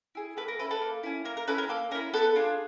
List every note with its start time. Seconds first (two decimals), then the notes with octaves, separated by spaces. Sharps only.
0.15 E4 G#4
0.37 A#3 A4 B4
0.48 A#4
0.59 C#4 E4 A4 B4
0.71 A4 B4
0.81 A#3
1.03 C#4 E4
1.25 A#3 A#4
1.37 A#4
1.47 C#4 E4 A4 B4
1.58 A#4
1.69 A#3 A4
1.91 C#4 A#4
1.95 E4
2.13 B3 A4 B4
2.36 D4 F4 G#4